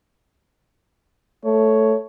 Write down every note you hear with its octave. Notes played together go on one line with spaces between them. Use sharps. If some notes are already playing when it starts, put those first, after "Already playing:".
A3 C#5